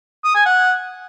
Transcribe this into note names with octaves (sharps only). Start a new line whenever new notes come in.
D#6
G#5
F#5